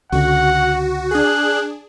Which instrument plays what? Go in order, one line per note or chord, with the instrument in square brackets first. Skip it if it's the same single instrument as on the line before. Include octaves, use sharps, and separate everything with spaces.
[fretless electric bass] C#2 D3 [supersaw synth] F#4 [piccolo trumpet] F#5
[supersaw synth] D4 G#4 [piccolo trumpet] F#6